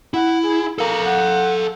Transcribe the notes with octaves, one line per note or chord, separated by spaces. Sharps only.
E4 F#5
G#4
A4 A#4 F5
F#5